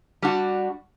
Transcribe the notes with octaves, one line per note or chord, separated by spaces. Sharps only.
G3 D4 F#4